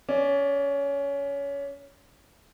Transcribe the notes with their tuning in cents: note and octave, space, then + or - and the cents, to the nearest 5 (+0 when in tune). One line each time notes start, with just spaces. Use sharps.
C#4 +20 D5 +0